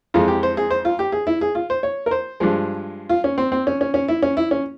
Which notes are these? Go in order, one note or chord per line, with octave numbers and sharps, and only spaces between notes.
F2 E3 G#3 F4
G4
C5
G#4
C5
F4
G4
G#4
E4
G#4
F4
C5
C#5
A#4
C5
G2 F3 G#3
F4
C#4
C4
C4
C#4
C#4
C#4
E4
C#4
E4
C#4